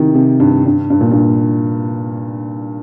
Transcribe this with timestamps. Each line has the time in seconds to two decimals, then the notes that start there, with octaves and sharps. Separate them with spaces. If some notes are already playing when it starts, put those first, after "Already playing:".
Already playing: C3 D#3
0.15 C3
0.40 G2
0.66 G2
0.90 G2
1.01 A#2
1.11 G2